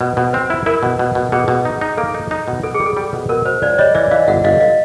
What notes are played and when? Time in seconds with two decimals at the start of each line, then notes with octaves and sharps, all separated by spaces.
0.01 B2 B4
0.17 B2 B4
0.33 C4 C5
0.50 E4 B4
0.66 E4 A#4
0.83 B2
0.99 B2
1.15 B2
1.32 B2 G#4
1.48 B2
1.65 D#4
1.81 D#4
1.97 A#3 A4
2.14 D#4
2.31 D#4
2.48 B2
2.63 B2 A4
2.74 G#4
2.80 G3
2.86 A4
2.97 G3
3.13 B2
3.29 B2 A#4
3.45 B2 C5
3.62 C#2 C5 D5
3.78 G3 C#5 D#5
3.95 E3 D5 E5
4.11 E3 D#5 F5
4.27 G1 E5 F#5
4.44 G1 D#5 F5
4.60 D#5 F5